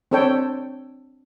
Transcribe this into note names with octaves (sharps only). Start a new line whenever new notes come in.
C4 D4 A4 C#5 G5